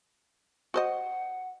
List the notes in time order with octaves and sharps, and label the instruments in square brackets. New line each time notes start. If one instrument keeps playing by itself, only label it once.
[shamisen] F#4 C5 D#5 [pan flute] F#5